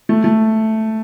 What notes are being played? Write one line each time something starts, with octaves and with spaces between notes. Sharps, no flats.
A3
A3